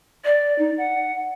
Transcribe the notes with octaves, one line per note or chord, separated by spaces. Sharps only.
D5
D#4
F#5